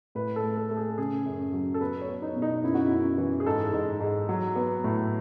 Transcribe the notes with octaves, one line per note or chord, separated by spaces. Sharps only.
A2 B4
A4
A3
A4
A3 A4
G#4
C#3 G#4
F#2
F#3
A4
B3 B4
C#5
B3
D#4
B2
D#4
F#2 E4
F#4
E4
F#2
E3
G#4
G#2 A4
G#2
G#2
F#3
B3
A2